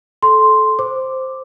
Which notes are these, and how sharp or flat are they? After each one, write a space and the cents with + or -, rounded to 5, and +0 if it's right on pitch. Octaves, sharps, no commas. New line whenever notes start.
A4 -20 C6 +0
C5 +0 D6 +0